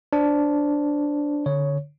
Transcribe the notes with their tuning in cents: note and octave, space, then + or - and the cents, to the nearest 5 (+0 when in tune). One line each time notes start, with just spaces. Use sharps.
D4 -5 C5 +0
D3 -5 C#5 +0